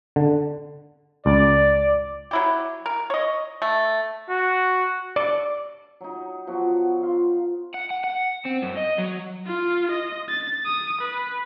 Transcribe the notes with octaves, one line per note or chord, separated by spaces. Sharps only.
D3
C#2 D5
F#3 E4 G4
A#4
C#5 D#5
A3
F#4
D5
F#3 D#4
F3 F#3 B3 F#4
F4 F5 C6
F#5
F#5
F#5
C4
F#2
D#5
F#3
F4
D#5
A6
D#6
B4